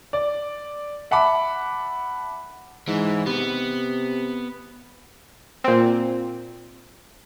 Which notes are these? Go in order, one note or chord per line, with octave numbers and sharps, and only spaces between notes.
D5
E5 F#5 A5 B5 D6
G#2 E3
C3 B3
A#2 C4